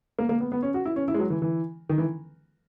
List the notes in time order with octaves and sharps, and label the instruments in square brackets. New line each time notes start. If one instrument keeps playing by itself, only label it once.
[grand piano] A#3
A#3
B3
B3
C#4
F#4
E4
C#4
E4
G#3
F#3
E3
E3
D#3
E3